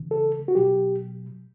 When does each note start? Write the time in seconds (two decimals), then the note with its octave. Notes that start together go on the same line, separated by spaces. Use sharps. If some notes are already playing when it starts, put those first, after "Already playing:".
Already playing: C#3 E3
0.11 A4
0.48 F#4
0.55 B2 F#3 G4